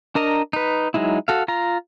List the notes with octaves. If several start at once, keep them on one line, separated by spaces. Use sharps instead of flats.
D4 A#4 D#5 A#5
D#4 B4
F#3 G#3 D#4 E4
F#4 A4 F5
F4 A#5